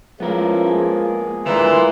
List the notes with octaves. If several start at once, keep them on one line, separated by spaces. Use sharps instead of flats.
F3 G#3 B3 C#4 E4 A#4
G#3 A#3 G#4
G1 D2 A#2 E3 A#4 C6 E6